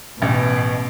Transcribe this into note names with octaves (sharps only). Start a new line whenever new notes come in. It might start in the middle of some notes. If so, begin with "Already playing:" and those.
A1 B2